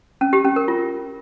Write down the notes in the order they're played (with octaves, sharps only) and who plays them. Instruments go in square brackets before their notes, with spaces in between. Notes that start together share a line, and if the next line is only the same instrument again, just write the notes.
[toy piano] C#4
G4
C#4
A#4
F4